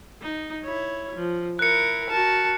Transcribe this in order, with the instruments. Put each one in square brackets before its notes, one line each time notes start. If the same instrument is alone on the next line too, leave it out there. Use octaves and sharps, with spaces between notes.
[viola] D#4
E4 C#5
F3
[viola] E4 [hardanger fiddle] A#4 [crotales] F#6 C#7
[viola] F#4 A#4 [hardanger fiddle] A5